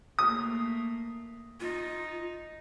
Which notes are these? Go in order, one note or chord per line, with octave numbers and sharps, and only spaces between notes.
A3 A#3 D#6
D#4 F4